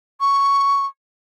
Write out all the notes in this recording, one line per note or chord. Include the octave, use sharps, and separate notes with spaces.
C#6